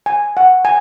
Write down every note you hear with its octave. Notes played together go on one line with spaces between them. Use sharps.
G#5
F#5
G#5